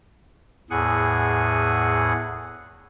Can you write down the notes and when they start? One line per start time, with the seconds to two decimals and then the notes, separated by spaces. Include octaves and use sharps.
0.70 E2 A2 G#4 F#5 G#5